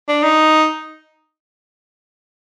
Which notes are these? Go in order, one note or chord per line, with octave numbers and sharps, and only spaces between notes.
D4
D#4